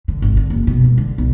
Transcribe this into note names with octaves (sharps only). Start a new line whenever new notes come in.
D3
G#1
D3
F#1
B2
G#2
D3
B1